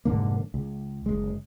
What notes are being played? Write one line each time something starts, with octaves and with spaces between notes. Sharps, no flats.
F1 G#2 D3 A#3
C#2
F#1 G#3